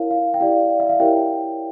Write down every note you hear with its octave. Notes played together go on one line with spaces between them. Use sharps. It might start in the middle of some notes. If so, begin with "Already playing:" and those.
Already playing: E4 A#4 C#5 F5
F5
G5
E4 G4 D5 F5
E5
F5
E4 G4 A#4 C#5 G5